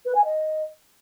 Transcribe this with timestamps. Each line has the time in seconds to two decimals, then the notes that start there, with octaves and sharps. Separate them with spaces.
0.05 B4
0.15 G#5
0.25 D#5